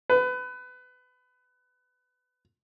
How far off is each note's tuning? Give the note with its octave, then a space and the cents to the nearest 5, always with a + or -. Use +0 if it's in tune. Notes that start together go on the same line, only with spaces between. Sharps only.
B4 +25